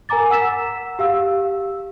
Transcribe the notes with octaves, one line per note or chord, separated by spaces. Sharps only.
A#4 G#5 A#5 D6 A6
F#5 E6 B6 E7
G4 F5 E6